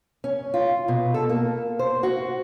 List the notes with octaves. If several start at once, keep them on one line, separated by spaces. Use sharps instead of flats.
C#4
F4
B2
A4
A#3
C5
F#4